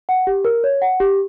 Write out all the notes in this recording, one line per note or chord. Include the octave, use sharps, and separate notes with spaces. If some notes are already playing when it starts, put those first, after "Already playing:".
F#5
G4
A#4
C#5
F#5
G4